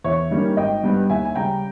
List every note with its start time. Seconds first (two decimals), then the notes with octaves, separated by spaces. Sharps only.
0.04 E2 C#5 E5
0.31 D#3 G3 A#3 C#4
0.57 G#1 D#5 G5
0.84 G2 G3 B3
1.10 D#2 E5 G#5
1.25 G#5
1.35 C#3 G3 G5 A#5